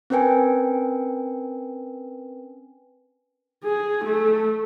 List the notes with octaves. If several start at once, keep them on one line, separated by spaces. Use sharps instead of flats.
C4 C#4 A#4 B4 G5 G#5
G#4
A3